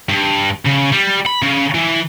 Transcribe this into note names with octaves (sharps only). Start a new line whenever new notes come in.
G2
C#3
G3
B5
C#3
E3